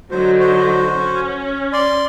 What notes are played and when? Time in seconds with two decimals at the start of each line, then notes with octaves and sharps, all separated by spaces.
0.11 D3 F#3 D#4 C5
0.40 F#4 C5
0.98 C#4
1.73 D5 C6